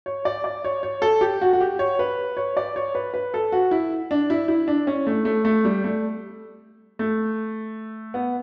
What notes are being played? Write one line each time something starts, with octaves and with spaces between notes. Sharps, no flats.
C#5
D5
D5
C#5
C#5
A4
G4
F#4
F#4
G4
C#5
B4
C#5
D5
C#5
B4
B4
A4
F#4
E4
D4
E4
E4
D4
C#4
A3
A3
A3
G3
A3
A3
B3